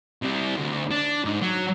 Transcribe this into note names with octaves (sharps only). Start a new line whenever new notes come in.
C3 G3
D2
D4
G#2
F#3